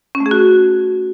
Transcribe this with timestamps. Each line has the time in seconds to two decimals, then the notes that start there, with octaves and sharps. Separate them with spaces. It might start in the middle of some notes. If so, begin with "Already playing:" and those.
0.15 C#4
0.20 A3
0.26 G#4
0.31 F#4